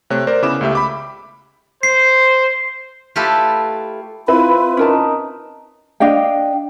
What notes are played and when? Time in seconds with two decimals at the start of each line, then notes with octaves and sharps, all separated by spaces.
0.10 C3 A3 C#5 F#6
0.27 A#4 C5 D5
0.42 C#3 B3 E4 D6 E7
0.61 C#2 A3 G4 E5
0.75 B5 D6
1.83 C5 C7
3.16 A3 E4 F4 G4 A4 B4
4.28 C4 E4 F4 B4 B5
4.77 C#4 D#4 A#4 A5
6.00 D4 D#5 F5 G5